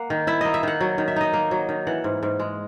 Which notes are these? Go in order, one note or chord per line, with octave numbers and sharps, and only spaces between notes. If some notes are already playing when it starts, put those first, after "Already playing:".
Already playing: A#3 F#5
D#3
E4 E5
A#3 D#5
E5
D#3 F#5
F#3
D#3
E5
D#4 D#5
A#3
F#3
D#3
E3 F#5
G#2
G#2
G#3